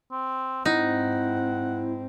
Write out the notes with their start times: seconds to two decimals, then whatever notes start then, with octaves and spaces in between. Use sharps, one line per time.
0.12 C4
0.65 G#2 C4 D#4 E4 F#5